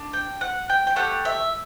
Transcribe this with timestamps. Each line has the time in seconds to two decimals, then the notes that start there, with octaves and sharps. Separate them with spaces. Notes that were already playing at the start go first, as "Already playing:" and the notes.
Already playing: D4
0.13 G5
0.41 F#5
0.70 G5
0.87 G5
0.96 A3 E4 G4 F#5
1.25 E5